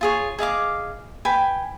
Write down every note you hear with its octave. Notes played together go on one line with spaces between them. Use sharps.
F4 G#4 C#5
G#4 D#5 F5 D6
B4 G5 G#5